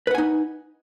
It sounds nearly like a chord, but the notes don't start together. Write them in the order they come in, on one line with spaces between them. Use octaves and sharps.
B4 F#5 G#5 D#4